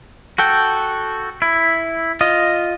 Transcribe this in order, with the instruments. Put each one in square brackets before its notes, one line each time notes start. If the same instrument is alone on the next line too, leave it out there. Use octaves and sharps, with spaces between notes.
[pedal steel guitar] F#4 A4 G5
E4
F4 D#5